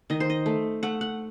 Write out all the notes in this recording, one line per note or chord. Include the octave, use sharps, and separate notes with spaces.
D#3 D#5
C5
D#5
A3
A3 F#5
F#5